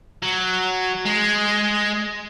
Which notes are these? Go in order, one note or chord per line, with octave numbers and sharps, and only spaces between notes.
F#3
G#3